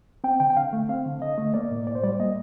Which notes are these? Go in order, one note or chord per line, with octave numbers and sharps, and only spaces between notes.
C4 G5
D3 G5
G5
D3 F5
A3
C4 F5
D3
D3 D#5
A3
A#3 D5
A2
A2 D5
C5
G3 D5
A#3 D#5